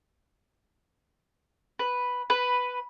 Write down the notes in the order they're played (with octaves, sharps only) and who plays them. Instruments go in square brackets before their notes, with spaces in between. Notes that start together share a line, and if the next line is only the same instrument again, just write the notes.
[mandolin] B4
B4